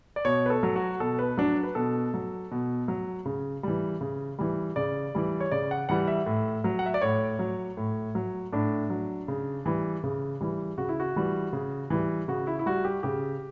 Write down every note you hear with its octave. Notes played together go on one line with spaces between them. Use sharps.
D5
B2 C#5
B4
A4
F#3
F#4
B2 A4
B4
F#3 D4
B4
B2 A4
F#3
B2
F#3
C#3
E3 G3
C#3
E3 G3
C#3 D5
E3 G3
C#5
C#3 D5
F#5
E3 G3 F#5
E5
A2
F#3
F#5
E5
D5
A2 C#5
F#3
A2
F#3
A2 D4
F#3
C#3
E3 G3
C#3
E3 G3
C#3 F#4
E4
F#4
E3 G3
C#3
E3 G3
C#3 F#4
E4
E4
G3 F#4
G4
C#3 G4